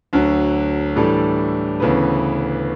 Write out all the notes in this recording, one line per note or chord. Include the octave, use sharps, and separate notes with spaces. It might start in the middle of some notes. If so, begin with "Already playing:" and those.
D2 D3 F#3
A2 E3 G3 D4 A4
D2 C#3 E3 B3